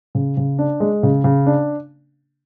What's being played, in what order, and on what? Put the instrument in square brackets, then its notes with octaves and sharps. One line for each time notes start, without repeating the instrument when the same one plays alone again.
[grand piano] C#3
C#3
D4
G#3
C#3
C#3
D4